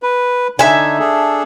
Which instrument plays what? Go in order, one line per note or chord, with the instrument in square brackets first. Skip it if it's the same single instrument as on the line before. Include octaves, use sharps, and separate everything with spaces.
[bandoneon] B4
[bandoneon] D3 D4 D#4 [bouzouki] E5 G#5
[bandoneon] D4 G#4 A4